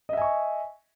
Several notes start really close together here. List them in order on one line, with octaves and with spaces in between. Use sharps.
D#5 E5 G#5 C#6